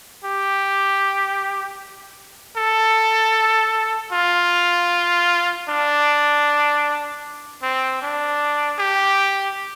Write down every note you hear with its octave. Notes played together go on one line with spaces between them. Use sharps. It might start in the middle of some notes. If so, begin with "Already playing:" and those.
G4
A4
F4
D4
C4
D4
G4